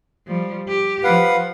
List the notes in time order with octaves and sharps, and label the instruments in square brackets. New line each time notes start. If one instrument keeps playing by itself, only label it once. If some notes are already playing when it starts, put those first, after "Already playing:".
[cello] F3 G3
G4
[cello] F3 [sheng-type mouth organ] B4 F5 F#5